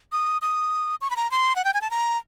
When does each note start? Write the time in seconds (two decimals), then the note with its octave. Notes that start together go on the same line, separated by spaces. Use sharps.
0.12 D#6
0.42 D#6
1.01 C#6
1.10 B5
1.16 A#5
1.31 C6
1.56 F#5
1.65 G5
1.74 G#5
1.81 A5
1.91 A#5